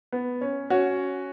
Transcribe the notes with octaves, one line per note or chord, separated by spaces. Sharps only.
B3
C#4
C#4 F#4